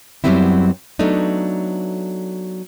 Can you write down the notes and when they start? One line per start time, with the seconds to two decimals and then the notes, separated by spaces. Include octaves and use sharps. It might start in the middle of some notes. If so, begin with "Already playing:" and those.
0.24 F#2 F#3 G3 B3 C4 E4
0.99 F#3 A3 B3 D4 D#4